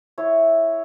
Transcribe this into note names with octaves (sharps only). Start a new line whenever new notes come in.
E4 C#5